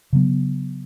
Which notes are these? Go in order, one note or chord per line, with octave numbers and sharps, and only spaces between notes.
C#3 F#3 B3